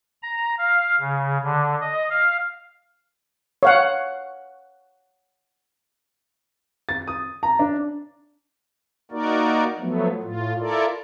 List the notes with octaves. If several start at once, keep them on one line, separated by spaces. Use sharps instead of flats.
A#5
F5
C#3
D3
D#5
F5
C#5 F5 F#5
A6
D#6
A#5
D4
A#3 D#4 F#4 A#4 D5
F3 F#3 A3 B3
A2 F4
E4 F4 A4 A#4 D5